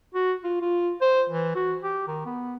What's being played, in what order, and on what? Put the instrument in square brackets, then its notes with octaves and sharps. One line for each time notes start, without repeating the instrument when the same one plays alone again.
[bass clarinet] F#4
F4
F4
C5
E3
F#4
G4
D#3
B3